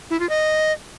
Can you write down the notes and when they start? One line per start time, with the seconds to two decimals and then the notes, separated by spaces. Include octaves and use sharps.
0.10 E4
0.20 F4
0.29 D#5